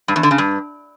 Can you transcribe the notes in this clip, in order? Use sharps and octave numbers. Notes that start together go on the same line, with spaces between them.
G2
E2
D3
C#3
G2